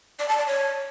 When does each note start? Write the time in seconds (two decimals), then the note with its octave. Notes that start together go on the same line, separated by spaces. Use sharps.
0.19 D5
0.29 A5
0.38 D5
0.47 C#5